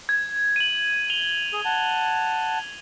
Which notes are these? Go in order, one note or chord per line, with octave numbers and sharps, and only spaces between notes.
G#6
D#7 F#7
F7 G7
G#4
F#5 A5